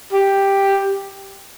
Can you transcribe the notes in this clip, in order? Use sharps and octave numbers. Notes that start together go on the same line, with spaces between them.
G4